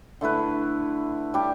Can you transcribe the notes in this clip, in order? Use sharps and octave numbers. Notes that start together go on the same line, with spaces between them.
D3 A3 E4 B4
G3 D4 G4